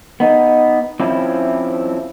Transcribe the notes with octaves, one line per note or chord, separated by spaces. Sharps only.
B3 D#4
F3 C4 C#4 E4